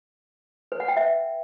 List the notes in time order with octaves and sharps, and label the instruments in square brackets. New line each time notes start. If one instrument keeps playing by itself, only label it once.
[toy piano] B4
F#5
G5
E5